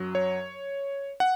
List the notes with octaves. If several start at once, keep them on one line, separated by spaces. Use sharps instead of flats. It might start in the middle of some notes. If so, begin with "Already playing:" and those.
Already playing: F#2 F#3
C#5
F#5